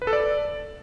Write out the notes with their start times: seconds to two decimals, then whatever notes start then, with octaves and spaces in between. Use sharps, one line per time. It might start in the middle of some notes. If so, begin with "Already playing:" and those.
0.02 B4
0.07 A4
0.13 D5